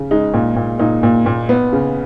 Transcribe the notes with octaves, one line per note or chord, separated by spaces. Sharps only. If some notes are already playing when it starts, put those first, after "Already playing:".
Already playing: C#3
G#3 D#4
A#2
A#2
A#2 D#4
A#2
A#2
B3
C#3